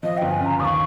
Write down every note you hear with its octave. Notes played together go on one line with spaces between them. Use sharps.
F3 D#5
G1 G5
G#5
C#3
A#5
D#2 D#6
C#6